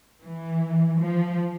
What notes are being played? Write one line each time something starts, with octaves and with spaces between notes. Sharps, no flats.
E3
F3